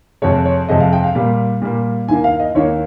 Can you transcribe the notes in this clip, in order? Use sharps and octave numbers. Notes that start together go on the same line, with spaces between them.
F2 C3 F3 G#3 C#5
C#5
F2 C3 F3 G#3 D#5
F5
G5
F5
A#2 G3 A#3
A#2 G3 A#3
D#2 D#3 A#3 G#5
F5
D#5
D#2 D#3 A#3 C#5